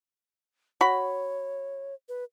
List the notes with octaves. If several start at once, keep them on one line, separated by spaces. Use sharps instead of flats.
F#4 C#5 B5
B4